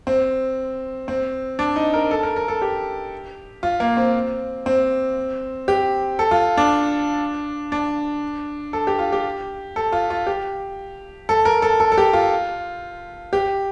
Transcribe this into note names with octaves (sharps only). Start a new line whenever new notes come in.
C4
C4
D4
D#4
A#4
A4
A#4
A#4
A4
G4
F4
A#3
C4
C4
G4
A4
F4
D4
D4
A4
G4
F4
G4
A4
F4
F4
G4
A4
A#4
A4
A4
A4
G4
F4
G4